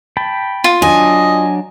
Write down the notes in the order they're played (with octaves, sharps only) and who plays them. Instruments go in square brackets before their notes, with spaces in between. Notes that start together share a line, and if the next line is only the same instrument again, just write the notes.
[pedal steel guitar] G5 A5 B5
[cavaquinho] F4
[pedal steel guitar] F#3 D4 [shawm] D#5 [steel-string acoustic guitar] G#5